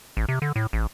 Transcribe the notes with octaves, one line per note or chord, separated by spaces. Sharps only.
A1
C3
D3
A2
A1